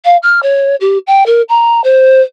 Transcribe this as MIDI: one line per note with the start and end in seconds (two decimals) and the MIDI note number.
0.05 0.17 77
0.23 0.40 89
0.43 0.76 73
0.81 0.98 67
1.07 1.26 79
1.26 1.42 70
1.49 1.81 82
1.84 2.21 72